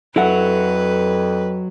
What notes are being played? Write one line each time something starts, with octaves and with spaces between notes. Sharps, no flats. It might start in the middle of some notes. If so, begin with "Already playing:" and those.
F2 F#3 E4 A4 B4 F#5